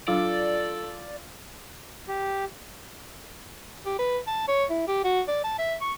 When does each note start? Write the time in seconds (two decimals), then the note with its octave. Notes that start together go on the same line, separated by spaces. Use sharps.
0.08 F#3 D4 F4 A4 D5
2.08 G4
3.86 G4
3.99 B4
4.27 A5
4.48 C#5
4.70 E4
4.88 G4
5.04 F#4
5.28 D5
5.44 A5
5.58 E5
5.81 C#6